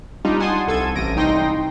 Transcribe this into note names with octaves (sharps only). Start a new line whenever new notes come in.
G3 D4 D#4 F4
F#5 G#5 A5 C6 D#6
C2 A4 G#6 D#7
A1 A#6 D7 D#7
C2 D#4 G5 C6 A#6